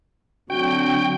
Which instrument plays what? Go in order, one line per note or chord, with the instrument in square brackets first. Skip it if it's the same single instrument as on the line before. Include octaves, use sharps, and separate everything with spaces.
[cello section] D3 F#3 C4 [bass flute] D4 [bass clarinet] F#4 [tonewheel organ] G5